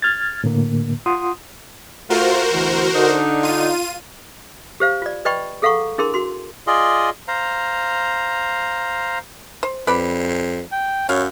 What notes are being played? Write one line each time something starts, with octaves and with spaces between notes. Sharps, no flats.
F6 G#6 A6
A2 D3 A#3
F4 F#5 C6 D#6
A3 F4 F#4 A#4 C5
D2 B2 E3
D3 D4 D#4
F4 D#7
G4 C5 F5
F4 D5
B4 D5 D#5 G5 B5 C#6
G#4 A4 F5 F#5 A#5 C#6
D4 E4 G#4 A#4 C6
F#4 C6
F4 G#4 D5 D#5
C5 F5 A#5
C5
F2 B4 D5 B5
G5
F#2 C#5 F5